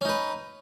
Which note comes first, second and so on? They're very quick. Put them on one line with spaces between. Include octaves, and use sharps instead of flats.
C#4 D#4 B4